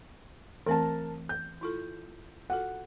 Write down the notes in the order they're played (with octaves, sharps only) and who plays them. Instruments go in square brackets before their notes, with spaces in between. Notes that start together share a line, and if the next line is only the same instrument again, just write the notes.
[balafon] E3 A3 C4 [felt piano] A#4 A5
[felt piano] G6
[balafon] E4 F4 A4
[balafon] F4 F#4 A4 [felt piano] F#5